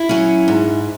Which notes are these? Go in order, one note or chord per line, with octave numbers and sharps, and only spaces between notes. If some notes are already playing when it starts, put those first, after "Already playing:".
Already playing: E4
F#3 C#4
G#2